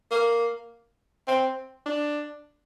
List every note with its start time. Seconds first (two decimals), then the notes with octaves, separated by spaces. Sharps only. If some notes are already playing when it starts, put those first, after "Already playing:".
0.11 A#3
1.28 C4
1.86 D4